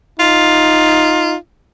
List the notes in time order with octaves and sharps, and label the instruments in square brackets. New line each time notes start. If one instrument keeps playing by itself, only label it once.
[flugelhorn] D#4 [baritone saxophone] F4